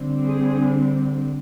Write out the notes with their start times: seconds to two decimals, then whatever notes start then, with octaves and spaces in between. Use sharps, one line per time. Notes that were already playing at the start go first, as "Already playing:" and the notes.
Already playing: D3 G3 C4
0.27 G#4